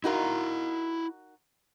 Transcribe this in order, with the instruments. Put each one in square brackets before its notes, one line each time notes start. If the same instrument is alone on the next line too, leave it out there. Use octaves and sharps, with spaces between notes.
[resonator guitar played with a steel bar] D#4 F#4 A#4 [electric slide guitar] E4 F5